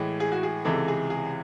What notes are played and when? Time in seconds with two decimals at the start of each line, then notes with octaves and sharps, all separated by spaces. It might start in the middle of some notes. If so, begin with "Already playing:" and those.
Already playing: A2 E3 G#3
0.20 G#4
0.32 F#4
0.43 G#4
0.65 C#2 C3 E3 G#3 A4
0.88 G#4
1.10 G#4